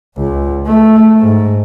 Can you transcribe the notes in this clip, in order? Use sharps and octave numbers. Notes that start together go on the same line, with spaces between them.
C#2
A3
G#2